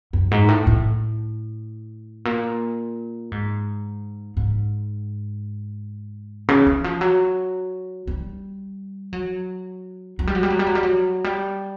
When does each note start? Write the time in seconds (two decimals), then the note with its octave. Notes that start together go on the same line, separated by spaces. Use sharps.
0.13 F#2
0.31 G#2
0.48 A2
0.67 A2
2.25 A#2
3.32 G#2
4.37 G#2
6.48 C#3
6.67 E3
6.84 F3
7.01 F#3
8.07 G3
9.13 F#3
10.19 F#3
10.27 G3
10.35 F#3
10.43 G3
10.50 F#3
10.59 G3
10.67 F#3
10.75 G3
10.83 F#3
11.24 G3